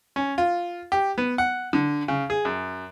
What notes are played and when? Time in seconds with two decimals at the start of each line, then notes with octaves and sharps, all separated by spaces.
0.16 C#4
0.38 F4
0.92 G4
1.18 B3
1.38 F#5
1.73 D3
2.08 C#3
2.30 G#4
2.45 F#2